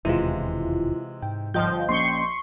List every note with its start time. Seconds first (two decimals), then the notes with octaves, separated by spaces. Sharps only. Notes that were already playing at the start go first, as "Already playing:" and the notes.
0.05 E1 D#2 C3 E3 G#3 E4 F4
1.22 G#2 G5
1.54 G1 F3 D#5 G5 G6
1.89 A#1 A#3 C4 C#4 C6 C#6